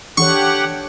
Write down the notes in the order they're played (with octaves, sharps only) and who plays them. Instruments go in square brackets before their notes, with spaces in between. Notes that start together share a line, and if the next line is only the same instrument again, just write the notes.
[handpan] D4 A4 C#5 [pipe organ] G4 F#5 [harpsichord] C#6